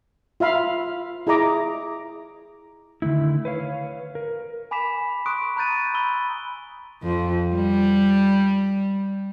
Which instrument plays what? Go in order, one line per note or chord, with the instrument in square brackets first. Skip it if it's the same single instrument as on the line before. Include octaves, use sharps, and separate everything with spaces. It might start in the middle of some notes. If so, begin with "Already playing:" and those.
[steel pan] F4 E5 F5 B5
E4 G#4 D#5 A#5 D6
[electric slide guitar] D3 D#3 A3 E4
B4 C#5 F5
A#4
[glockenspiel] G#5 B5 D6 B6 E7
C6 C#6 D#6 F#6 D7
A#5 B5 F#6 G6 A6 D#7
B5 C6 E6 G7
[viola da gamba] F2
G3